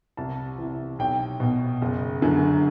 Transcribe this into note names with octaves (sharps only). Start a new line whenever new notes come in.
C2 A5
C3 E3
B1 G5
B2
F#1
F#2 D3